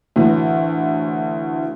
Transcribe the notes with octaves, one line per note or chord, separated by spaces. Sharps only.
D2 A2 E3